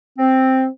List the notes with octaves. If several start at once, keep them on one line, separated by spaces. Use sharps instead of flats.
C4